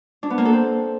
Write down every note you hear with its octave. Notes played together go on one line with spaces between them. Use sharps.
D4
B3
A#3
A4
C4